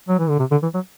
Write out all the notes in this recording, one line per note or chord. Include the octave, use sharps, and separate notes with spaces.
F#3
E3
D3
C3
D3
E3
F#3